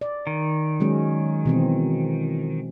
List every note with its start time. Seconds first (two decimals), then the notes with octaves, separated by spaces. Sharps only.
0.01 D5
0.27 D#3
0.80 F#3 G#3 C#4
1.45 B2 E3 C4